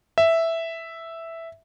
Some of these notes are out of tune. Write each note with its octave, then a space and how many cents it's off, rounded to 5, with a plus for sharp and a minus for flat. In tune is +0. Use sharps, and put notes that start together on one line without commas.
E5 +0